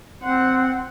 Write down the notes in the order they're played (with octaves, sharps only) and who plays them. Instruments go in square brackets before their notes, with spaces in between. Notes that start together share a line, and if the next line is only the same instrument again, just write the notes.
[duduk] C4 [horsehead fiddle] C5 F#5